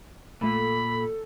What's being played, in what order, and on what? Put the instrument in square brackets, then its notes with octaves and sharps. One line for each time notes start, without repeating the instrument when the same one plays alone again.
[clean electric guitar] A#2 [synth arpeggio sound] A3 A#3 [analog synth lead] A4 [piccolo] B5